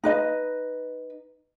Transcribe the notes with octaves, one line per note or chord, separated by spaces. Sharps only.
D#4 B4 D#5